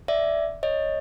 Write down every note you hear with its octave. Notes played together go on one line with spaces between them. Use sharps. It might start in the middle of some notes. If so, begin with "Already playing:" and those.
D5 E5
C#5 D#5